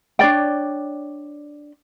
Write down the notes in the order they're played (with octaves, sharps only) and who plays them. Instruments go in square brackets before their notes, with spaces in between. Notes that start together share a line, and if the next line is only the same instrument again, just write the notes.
[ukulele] D4 C#5 D5 G5